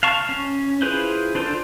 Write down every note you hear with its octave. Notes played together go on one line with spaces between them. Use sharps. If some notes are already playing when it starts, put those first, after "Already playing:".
F5 A5 C#6
C#4
E4 F4 G#4 B4 C5
D4 F4 A4 C5 D5